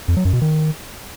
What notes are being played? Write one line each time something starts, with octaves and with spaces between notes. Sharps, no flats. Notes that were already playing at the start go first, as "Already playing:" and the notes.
F2
F#3
F#2
B2
D#3